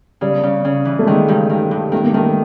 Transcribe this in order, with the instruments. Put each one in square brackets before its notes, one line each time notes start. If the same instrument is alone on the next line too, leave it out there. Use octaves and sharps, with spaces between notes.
[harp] C#3 [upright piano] G3
[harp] C#3
C#3
E3
[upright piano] A3
[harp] D#3 [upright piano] G#3
[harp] G2
D#3
G2
[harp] D#3 [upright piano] A3
[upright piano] A#3
[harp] D#3 [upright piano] A3